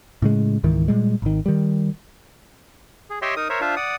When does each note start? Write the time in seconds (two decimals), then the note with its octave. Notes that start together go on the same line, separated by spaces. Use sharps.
0.22 A2 C#3 G#3
0.64 C#2 G#2 D#3 E3
0.88 A#2 G3 G#3
1.22 G#1 D#3
1.46 D#3 G3
3.10 G#4
3.22 G4 C#5 D#5 E5 G5 C6
3.37 D#4 A#4 D#6
3.50 A#4 C5 C#5 E5
3.61 D4 F4 C5 E5 F5
3.76 D5 F#5 D#6